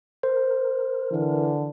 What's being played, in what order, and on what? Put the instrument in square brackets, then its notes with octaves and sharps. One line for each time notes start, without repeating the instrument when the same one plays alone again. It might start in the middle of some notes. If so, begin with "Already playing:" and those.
[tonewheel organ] A#4 [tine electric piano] C5
[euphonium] D3 [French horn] E3